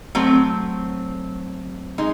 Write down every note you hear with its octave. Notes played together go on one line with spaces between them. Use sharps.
F#3 A3 C4
G#3 D#4